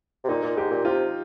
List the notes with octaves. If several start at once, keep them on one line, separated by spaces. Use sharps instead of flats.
C3
A#2 D#4
A#2
G#2 G4
A#2
C3 F4